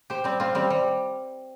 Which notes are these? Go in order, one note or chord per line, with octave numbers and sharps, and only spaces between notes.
G4 C5
G3 C4
C4 F4
G3 C4
G3